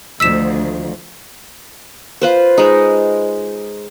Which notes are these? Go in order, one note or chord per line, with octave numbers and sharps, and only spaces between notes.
D2 D#3 F3 E6 B6 E7
F4 B4 C5
G#3 D#4